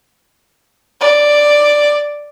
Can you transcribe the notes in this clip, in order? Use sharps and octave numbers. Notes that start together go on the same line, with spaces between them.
D5